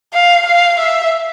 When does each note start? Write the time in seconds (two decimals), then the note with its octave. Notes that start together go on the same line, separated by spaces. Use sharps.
0.14 F5
0.46 F5
0.79 E5